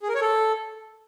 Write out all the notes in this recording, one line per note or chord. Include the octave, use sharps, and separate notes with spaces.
G#4
A#4
C#5
A4